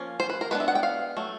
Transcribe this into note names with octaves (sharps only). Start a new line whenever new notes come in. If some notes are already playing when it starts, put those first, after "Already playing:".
Already playing: F3 A#3 C#4
C5
B4
A#4
G#3 B3 D4 B4
E5
F#5
G5
F5
F#3 A3